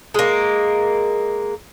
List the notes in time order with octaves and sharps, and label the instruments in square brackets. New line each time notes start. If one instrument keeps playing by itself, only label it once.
[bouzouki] G#3 A#3